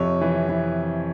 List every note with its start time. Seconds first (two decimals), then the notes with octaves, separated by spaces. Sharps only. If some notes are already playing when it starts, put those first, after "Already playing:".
Already playing: F2 C3 C#5
0.21 E3
0.49 E3